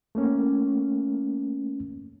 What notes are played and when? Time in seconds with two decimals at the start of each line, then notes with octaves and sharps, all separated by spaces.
0.15 A3 A#3 C#4